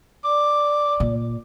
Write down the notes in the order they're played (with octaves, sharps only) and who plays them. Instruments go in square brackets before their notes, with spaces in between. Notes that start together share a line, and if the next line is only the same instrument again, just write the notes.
[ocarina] D5 [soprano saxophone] D6
[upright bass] A#2